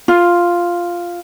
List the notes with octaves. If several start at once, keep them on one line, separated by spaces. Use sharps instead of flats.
F4